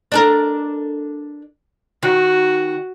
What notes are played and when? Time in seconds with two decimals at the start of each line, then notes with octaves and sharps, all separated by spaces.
0.12 D4 A4 A#4
2.03 D#3 F#4